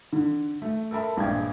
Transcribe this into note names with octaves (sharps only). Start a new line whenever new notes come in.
D3
A3
A4 A#4 E5 A5 B5
A#1 G2 G#3 G5 G#6